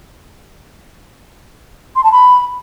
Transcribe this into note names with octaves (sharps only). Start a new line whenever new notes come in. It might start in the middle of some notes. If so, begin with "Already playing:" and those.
C6
A5
B5